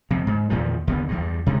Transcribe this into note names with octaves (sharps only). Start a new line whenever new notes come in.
F2 C3
G#2
E2 A#2 D#3 F3
D#2 D3 B3
E2 G2
C3 G#3